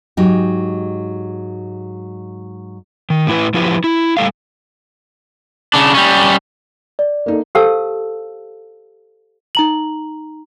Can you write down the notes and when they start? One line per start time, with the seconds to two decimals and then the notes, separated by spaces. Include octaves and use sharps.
0.17 G#2 F#3 G#3 D#4 G4
3.10 D#3
3.27 A2 E4 B4
3.54 F3 E4 G4 B4
3.84 E4
4.17 A2 G3 A4 F5
5.74 C#3 D4
5.95 G3 C#4
6.99 D5
7.26 A#3 D#4 A4
7.55 G4 A4 C5 F5 A5 E6
9.55 D#4 A#5 F#7